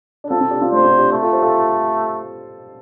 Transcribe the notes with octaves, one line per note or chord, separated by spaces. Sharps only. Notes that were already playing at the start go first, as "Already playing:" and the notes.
D4
C4 F4 A4
C4 F4
D4 G4
C4 F4
A3 D4 C5
C4 F4
D4 G4
A3
F4 A4
G4 C5
F4 A4